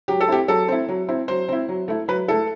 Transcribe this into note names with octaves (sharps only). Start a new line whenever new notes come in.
F#3 G4
A4
C4 E4 G4
F#3 A4
C4 E4
F#3
C4 E4
F#3 C5
C4 E4
F#3
A3 E4
F#3 B4
A3 E4 A4